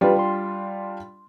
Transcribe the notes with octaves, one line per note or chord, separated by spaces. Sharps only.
G3 D4 F4 G4 B4
C6